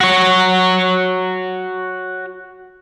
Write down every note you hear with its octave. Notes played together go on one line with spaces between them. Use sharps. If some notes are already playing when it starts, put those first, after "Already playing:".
F#4 C#5